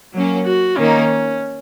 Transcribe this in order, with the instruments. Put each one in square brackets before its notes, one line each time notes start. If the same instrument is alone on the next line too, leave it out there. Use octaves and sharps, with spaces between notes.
[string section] F#3 A#3 C#4
[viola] F#4
[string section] D#3 A#3 D#4 [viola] C#4